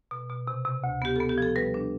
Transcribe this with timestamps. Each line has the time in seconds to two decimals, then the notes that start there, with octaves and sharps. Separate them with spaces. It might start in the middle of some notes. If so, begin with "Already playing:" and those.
0.11 B2
0.29 B2
0.48 C3
0.65 C3
0.84 D2
1.02 B3 G4
1.16 A4
1.20 B3
1.29 G4
1.38 F3 A4
1.56 G3 B4
1.74 D4